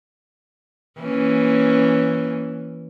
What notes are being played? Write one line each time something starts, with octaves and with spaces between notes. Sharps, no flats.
E3 A#3 C#4